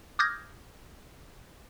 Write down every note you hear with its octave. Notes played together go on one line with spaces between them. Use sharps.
D6 D#6 F6 G6 G#6 A#6